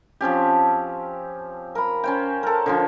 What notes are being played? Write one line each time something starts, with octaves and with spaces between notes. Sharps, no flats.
F3 C4 C#4 G4
A#4 B5
C#4 C5 G5
A4 A#4
D3 F3 C#4